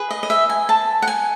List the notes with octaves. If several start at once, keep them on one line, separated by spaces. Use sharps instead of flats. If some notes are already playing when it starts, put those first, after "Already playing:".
Already playing: G#4 B4
D#5
D#5
E5
G#5
A5
F#5
G#5